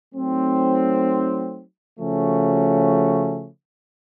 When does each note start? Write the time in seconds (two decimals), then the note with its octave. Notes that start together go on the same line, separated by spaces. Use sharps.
0.13 F#3 A3 C4 D#4
1.99 C#3 F3 A3 C#4 F#4